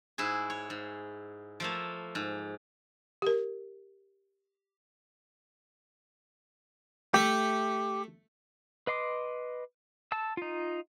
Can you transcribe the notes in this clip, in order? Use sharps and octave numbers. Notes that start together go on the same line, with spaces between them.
G#2 E4 F#4 G#4
C#5
G#2
F3 A3 A#3
G#2
G4 A#4
A3 G4
B4 D#5 C6 D6
A5 E6
D#4 F4